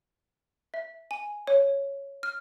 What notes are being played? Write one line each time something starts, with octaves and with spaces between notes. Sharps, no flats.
E5
G#5
C#5
F6